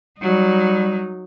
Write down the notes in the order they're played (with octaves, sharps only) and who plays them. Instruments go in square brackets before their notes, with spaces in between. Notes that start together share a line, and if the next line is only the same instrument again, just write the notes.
[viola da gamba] F#3 D#4 [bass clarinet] G3